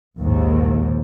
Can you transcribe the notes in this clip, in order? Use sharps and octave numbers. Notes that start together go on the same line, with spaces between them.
A#1 D#2 G#2